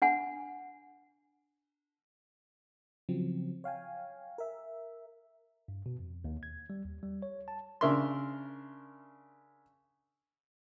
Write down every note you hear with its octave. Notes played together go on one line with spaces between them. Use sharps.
D4 F#5 G#5
C#3 F3 F#3 C4
C#5 F5 G5 G#5
A#4 E5
G2
B2
F2
D#2
G#6
G3
D#2
G3
C#5
A5
C#3 D4 A#4 E5 C6